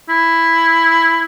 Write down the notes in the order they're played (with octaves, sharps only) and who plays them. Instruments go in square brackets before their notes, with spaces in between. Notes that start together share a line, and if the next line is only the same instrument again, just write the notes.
[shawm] E4